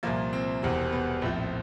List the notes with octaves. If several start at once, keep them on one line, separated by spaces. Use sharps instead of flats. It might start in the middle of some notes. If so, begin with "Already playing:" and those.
C2 A#2 F3 A#3
C4
E1 E2 C3 C4
B3
A#1 A2 F3 C4